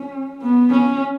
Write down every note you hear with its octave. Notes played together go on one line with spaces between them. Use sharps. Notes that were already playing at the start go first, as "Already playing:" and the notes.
Already playing: C#4
B3
C#4